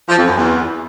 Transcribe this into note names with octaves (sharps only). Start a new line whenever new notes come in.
F3
F2
F#2
E2